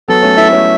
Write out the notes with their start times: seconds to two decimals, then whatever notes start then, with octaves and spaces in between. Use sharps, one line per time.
0.08 F#3 B3 A4
0.22 A3 C#4
0.37 B3 E4 E5
0.52 A3 C#4